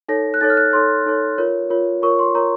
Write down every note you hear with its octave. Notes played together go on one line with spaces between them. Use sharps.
D#4 A4 C#5 A#6
F#6
D#4 A4 C#5 A6
F6
F#6
D#4 A4 C#5 C6
D#4 A4 C#5
F4 A#4 C#5
F4 A#4 C#5
F4 A#4 C#5 C#6
C6
F4 A#4 C#5 A#5